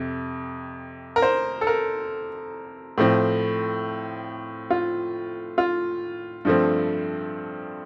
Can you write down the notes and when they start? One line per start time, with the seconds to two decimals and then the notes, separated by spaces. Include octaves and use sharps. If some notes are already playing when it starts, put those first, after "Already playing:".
Already playing: F2 C3
1.16 A#4
1.22 C5
1.61 A4
1.67 A#4
2.98 A2 F3 C4
4.70 F4
5.58 F4
6.45 G2 F3 A3 C4